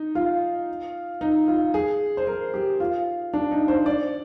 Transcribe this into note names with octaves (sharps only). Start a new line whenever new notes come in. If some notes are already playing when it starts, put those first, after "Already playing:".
Already playing: D#4
F4
D#4
F4
G#4
C5
A#4
G4
F4
D4
D#4
C5
D5